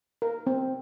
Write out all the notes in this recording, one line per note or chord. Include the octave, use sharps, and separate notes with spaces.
A#4
C4